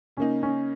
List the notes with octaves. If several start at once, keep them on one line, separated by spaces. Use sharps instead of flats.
C#3 A#3 C#4 D#4
C#4